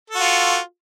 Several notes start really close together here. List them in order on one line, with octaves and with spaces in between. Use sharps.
A4 F#4 F4